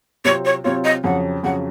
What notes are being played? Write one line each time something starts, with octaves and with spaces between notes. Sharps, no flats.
C3 F#3 C4 F4 C#5
C#5
C3 F#3 C4 F4 C#5
D#5
F2 C#3 F#3 F#5
F2 C#3 F#3 F#5